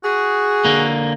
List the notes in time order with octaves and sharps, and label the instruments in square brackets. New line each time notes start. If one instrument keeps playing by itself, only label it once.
[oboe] F#4 [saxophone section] G#4
[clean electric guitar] D3 A#3